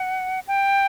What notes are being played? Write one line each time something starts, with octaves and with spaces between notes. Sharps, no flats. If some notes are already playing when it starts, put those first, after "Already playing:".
Already playing: F#5
G5